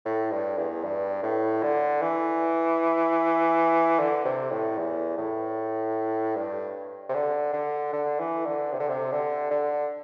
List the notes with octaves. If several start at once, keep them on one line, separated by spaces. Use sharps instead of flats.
A2
G2
E2
G2
A2
D3
E3
D3
C3
A2
E2
A2
G2
C3
D3
D3
D3
E3
D3
C3
D3
C3
D3
D3